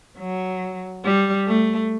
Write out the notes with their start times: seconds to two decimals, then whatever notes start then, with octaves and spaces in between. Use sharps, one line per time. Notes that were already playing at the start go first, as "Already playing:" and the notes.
0.18 F#3
1.04 G3
1.48 A3